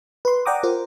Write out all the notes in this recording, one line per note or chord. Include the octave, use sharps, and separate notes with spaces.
B4 C6
D5 F#5 G5 A#5 D6 D#6
F4 A#4 C5